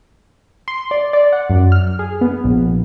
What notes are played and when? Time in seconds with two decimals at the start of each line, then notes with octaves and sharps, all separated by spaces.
0.68 C6
0.91 D5
1.13 D5
1.32 F#5
1.50 F#2
1.72 F6
1.99 G#4
2.21 B3
2.44 A#1